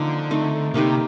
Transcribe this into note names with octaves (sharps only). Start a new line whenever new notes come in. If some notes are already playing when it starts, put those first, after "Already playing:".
Already playing: D3 F3 A#3 C#4 D#4
A3 C4 D#4
C3 A#3 D#4 G4 B4